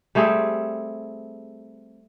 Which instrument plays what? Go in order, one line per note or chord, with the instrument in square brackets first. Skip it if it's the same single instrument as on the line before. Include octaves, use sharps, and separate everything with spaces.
[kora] G3 A3 C4 G#4